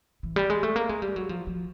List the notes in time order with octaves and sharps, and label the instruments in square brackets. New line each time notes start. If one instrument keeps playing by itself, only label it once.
[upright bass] E3
G3
G#3
A3
A#3
G#3
G3
F#3
F3
F3